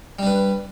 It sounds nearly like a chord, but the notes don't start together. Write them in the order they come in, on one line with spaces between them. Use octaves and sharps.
G3 D4 B4